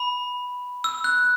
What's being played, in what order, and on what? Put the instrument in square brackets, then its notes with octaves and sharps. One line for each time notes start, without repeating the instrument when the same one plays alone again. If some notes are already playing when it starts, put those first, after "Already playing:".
Already playing: [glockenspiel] B5
E6
F#6